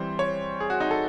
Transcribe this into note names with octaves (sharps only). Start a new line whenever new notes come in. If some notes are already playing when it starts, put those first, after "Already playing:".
Already playing: E3 G3 C4 C5
C#5
G#4
F#4
D#4
A4